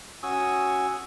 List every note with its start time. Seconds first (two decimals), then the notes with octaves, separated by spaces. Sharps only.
0.23 C#4 F#4 G#5 C#6 D#6 E6